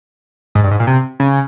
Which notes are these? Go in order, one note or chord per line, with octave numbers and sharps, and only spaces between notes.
G#2
G2
G#2
A#2
C3
C#3